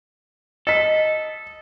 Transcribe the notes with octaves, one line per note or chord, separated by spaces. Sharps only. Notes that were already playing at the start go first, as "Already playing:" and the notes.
A4 D#5 B6